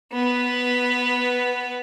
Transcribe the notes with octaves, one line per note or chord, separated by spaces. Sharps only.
B3 B4